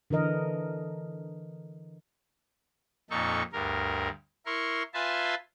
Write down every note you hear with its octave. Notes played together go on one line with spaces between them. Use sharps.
D3 E3 A#4 D#5
F2 A#2 D#4 A4 C#6
D2 G2 A#4
E4 A#4 C6 C#6
F4 B4 E5 G#5 A5 C6